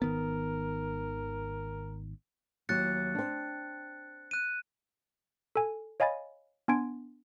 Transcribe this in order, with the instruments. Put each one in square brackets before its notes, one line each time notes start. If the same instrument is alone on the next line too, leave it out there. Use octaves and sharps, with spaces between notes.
[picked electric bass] G#1 D#3 B3 [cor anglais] A#4
[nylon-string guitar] D#2 F#3 [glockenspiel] F#6 A6 C#7
[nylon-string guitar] C4 D4
[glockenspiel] F#6 D#7
[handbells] A4 G#5
C#5 D#5 F5 G#5 B5 A6
B3 D4 G#5 C6 G#6 D7